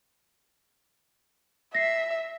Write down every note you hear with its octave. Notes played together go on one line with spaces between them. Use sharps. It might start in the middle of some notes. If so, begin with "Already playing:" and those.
E5 A#6 C7